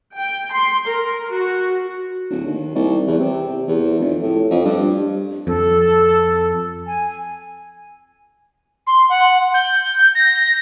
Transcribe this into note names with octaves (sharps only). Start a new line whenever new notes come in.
G5
C6
A#4
F#4
D1
D#2
C2
E2
C3
E2
F1
A2
F2
G2
F2 A4
G#5
C6
F#5
G6
A#6